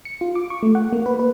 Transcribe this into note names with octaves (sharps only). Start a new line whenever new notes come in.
C#7
F4
D6
C#6
A3
F#5
A#3
B4
B4